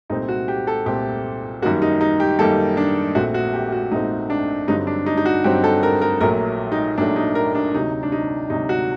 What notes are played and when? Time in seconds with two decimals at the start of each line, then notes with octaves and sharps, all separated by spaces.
0.10 C2 A#2 A3 C4 D#4
0.28 F#4
0.48 G4
0.67 A4
0.86 C2 A#2 A3 C4 G4
1.62 F#2 D#3 G3 A#3 F#4
1.82 D#4
2.01 D#4
2.20 G4
2.39 F#2 D#3 G3 A#3 A4
2.77 D4
3.15 A#1 A#2 A3 C4 F#4
3.34 F#4
3.53 G4
3.72 F#4
3.91 A#1 A#2 A3 C4 D#4
4.30 D4
4.68 G2 D3 F#3 C4 D#4
4.87 D4
5.06 D#4
5.17 D#4
5.25 F#4
5.44 G2 D3 F#3 C4 G4
5.64 A4
5.83 A#4
6.02 A#4
6.21 A#1 A#2 F#3 A3 A#4
6.72 D#4
6.98 A#1 A#2 F#3 A3 D4
7.16 D#4
7.35 A#4
7.55 D4
7.74 D2 C3 F#3 D#4
8.03 D4
8.12 D#4
8.50 D2 C3 F#3 D#4
8.69 F#4